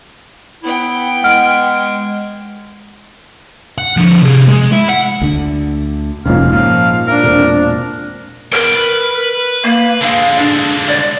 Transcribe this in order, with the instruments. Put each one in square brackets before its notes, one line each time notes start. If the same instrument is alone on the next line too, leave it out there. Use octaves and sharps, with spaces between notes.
[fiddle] B3 G5 [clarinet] E4
[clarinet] G#3 [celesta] F#5 F6 D7
[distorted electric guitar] F#5
D3 F3
C3 G#4
G#3
E4
F#5
[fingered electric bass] D2 D3
[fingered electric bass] F#1 F2 C3 [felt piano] G#2 C#4 F4 [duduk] A#3 [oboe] F5
[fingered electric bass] A#2 [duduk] F3 [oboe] F5
[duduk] D4 [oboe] A#4 [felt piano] F5
[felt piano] E1 C4
[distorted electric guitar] B3 G5 [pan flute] A#4
[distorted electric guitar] B4
[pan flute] A#3
[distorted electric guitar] D3 G#3 [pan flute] F5
[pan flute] D4
D5